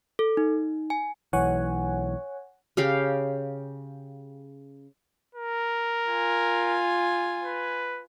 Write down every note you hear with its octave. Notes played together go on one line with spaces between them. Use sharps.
A4
D#4
G#5
B1 E3 C#5 F#5 G#5
C#3 G4 F5 G5
A#4
F4 G#5
B4